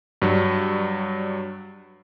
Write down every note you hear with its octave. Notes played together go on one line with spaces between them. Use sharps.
G2 F#3 G3